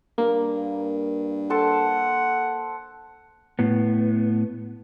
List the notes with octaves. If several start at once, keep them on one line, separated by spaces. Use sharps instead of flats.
G2 A#3
A4 C5 F#5 A5
A2 B3